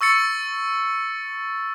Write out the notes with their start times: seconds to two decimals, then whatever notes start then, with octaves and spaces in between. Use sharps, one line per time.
0.01 C#6 E6 A6 C#7